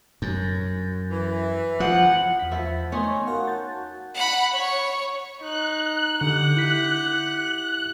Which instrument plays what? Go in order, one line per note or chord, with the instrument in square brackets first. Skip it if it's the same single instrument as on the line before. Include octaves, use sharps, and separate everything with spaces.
[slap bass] F#2
[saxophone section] E3
[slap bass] F3 [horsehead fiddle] F#5
[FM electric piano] E2 B6
[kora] F3 E4
[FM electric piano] A3 B3 [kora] C#4 D#4 C#5 [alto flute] C6
[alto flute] F#4 [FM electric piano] A#4 F5 F#5
[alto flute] F#4 [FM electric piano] A5 G6 A6
[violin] F#5 B5
C#5 C#6
[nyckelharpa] D#4 [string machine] F#6
[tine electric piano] D3 [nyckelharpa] G4 F#5
[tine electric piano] E4 B6 [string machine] F#6